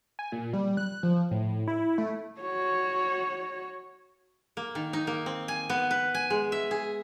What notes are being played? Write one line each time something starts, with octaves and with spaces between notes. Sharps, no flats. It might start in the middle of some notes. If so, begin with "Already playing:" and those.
G#5
A#2
G3
F#6
F3
A2
E4
A3
F#4 C#5
A#3
D#3
D#4
A#3
C4
G#5
B3
B4
G#5
G#3
E5
G#4